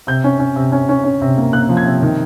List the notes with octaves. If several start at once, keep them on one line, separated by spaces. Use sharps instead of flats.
C3 G6
C#4
C#4
C3
C#4
C#4
C#4
C3
A#3
A#3 F#6
F3
G#6
C3
D#3